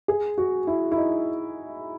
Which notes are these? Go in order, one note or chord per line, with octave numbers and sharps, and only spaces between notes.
G#4
F#4
E4
E4
D#4